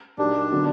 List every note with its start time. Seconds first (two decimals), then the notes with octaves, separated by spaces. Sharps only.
0.18 A#2 F#3 A#3 D4 D#4 G4
0.52 D3 F#3 B3